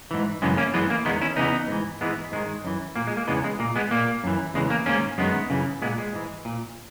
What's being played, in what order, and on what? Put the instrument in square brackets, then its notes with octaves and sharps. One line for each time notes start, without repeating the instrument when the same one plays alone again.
[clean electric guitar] G#2 E3
F#2 C#3 E3 G#3 B3
A#3 C#4
F#2 E3 G#3 B3
A#3
E2 D#3 G#3 B3
C#4 E4
E2 C#3 E3 B3 D#4
G#2 E3
G#2 E3 G#3 B3
G#2 D#3 G#3
F#2 E3
A#2 A#3
G#3
A#3
E2 C#3 E3 G#3 B3
G#3
A#2 A#3
G#3 B3
A#2 A#3
F#2 E3
E2 C#3 E3 G#3
A#3
G#2 D#3 A#3 C#4
F#2 D#3 G#3 B3
F#2 C#3 E3
A#2 G#3 B3
G#3
G#2 E3
A#2